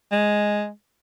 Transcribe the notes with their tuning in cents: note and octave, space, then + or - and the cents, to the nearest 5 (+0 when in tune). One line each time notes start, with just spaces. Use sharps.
G#3 +0